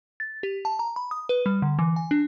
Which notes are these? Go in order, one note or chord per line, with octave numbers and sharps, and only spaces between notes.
A6
G4
A5
A#5
B5
D#6
B4
G3
D3
E3
G#5
D4